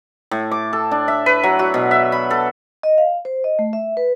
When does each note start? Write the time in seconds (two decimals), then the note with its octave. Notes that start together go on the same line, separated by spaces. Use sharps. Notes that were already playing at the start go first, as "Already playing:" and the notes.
0.31 A2
0.51 D6
0.73 A4
0.91 D4
1.08 E5
1.26 B4
1.43 F#3
1.59 F#4
1.74 B2
1.91 E5
2.12 B5
2.31 A4
2.83 D#5
2.98 F5
3.25 C5
3.44 D#5
3.59 A3
3.73 E5
3.97 B4